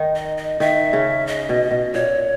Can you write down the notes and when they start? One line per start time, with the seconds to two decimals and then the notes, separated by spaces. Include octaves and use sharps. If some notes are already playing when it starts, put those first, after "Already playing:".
Already playing: D#3 D#4
0.16 D#5
0.38 D#5
0.60 D#3 D#4 E5
0.93 C#3 C#4
1.27 D#5
1.49 B2
1.71 B2
1.94 A#2 C#5